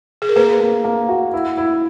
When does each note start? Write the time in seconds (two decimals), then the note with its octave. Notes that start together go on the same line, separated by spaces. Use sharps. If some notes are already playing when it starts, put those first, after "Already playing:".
0.22 G#4
0.29 A#4
0.36 A#3 G#4 B4
0.60 A#3
0.85 A#3
1.09 F#4
1.33 E4
1.57 E4